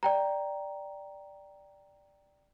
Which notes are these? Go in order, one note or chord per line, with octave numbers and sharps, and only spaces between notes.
D5 G5 A#5